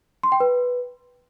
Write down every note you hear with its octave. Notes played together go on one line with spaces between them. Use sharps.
C6
G5
B4